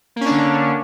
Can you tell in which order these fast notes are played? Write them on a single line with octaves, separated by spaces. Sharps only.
A#3 C#4 D4 D3